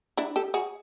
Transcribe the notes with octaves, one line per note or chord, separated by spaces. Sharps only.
D4 E4
G4 A4
F#4 G#4